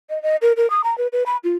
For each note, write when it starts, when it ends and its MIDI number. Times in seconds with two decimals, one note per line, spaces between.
0.10 0.21 75
0.23 0.36 75
0.42 0.52 70
0.57 0.69 70
0.70 0.82 87
0.84 0.97 82
0.98 1.07 71
1.12 1.23 71
1.26 1.37 83
1.44 1.57 65